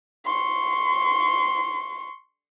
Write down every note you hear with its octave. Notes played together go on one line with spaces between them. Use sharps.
C6 C#6